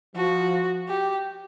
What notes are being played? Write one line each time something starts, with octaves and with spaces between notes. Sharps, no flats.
F3 F#4
G4